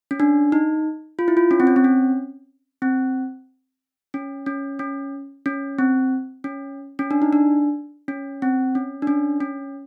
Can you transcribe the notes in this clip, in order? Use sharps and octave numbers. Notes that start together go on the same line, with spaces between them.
C#4
D4
D#4
F4
E4
F4
C#4
C4
C#4
C4
C#4
C4
C#4
C#4
C#4
C#4
C4
C#4
C#4
D4
D#4
D4
C#4
C4
C#4
D4
C#4
C#4